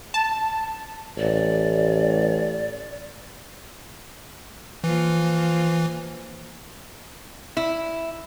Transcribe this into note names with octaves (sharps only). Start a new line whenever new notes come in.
A5
A1 D5
E3 F3 A#3 F4
E4